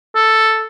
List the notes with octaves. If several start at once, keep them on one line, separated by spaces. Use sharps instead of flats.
A4